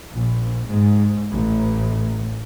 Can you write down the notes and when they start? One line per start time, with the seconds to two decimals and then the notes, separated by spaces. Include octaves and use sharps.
0.13 A#1
0.68 G#2
1.28 A1